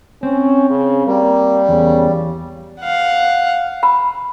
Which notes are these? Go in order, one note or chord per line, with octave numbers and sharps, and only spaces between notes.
C4 C#4
C#3
G3 A#3
E2 C#3
F5 F#5
B5